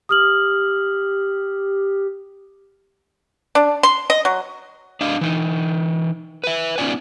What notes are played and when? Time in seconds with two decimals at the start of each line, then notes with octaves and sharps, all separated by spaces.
0.09 G4 D#6 F6 F#7
3.55 D4
3.83 C6
4.10 D#5
4.25 F#3
5.01 D4 D#5 F5
5.21 E3 D#4
6.44 B4 E5
6.78 B3 C#4 D#4 F4 D5 G#5